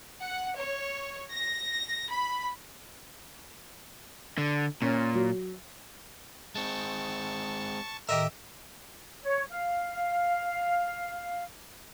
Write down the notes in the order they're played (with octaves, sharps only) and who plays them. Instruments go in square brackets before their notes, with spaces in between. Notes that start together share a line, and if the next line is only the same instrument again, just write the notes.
[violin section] F#5
C#5
A#6
B5
[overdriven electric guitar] D3
[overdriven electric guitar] A#2 [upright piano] C#4
[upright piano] F#3
[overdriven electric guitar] G#3 C4 [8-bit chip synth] A5 C#6
[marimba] A2 D#3 [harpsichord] G4 D#5 E5 [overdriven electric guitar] A#4
[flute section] C#5
F5